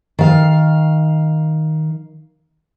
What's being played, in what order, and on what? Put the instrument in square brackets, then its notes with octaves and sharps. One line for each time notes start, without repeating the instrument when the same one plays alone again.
[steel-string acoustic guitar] D#3 F5